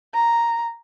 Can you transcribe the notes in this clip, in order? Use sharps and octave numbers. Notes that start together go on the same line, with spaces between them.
A#5